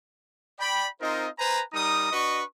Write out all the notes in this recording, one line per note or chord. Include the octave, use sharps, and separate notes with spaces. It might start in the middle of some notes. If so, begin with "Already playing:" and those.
D5 G5 B5
C4 D#4 F4 A#4 C5 D#5
B4 C5 G#5 A#5
G3 D#4 A#4 A#5 D#6
D4 F#4 B4 D#5 C#6